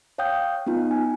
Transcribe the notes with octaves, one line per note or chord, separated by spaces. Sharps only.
C#5 F5 G5 D#6 G6
B3 D#4 F4
G#5